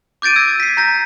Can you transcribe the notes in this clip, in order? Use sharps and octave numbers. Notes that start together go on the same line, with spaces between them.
D6 G6 A6 D7 D#7
E6 G#6 A#6
B6 C7
A#5 G6 A#6